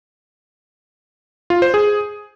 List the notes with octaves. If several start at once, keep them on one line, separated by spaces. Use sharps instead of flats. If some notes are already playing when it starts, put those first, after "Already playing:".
F4
C5
G#4